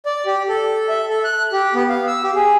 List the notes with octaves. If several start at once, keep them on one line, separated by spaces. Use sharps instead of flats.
D5
G4
A4
E5
A4
F#6
G4
B3
F5
E6
G4
G#4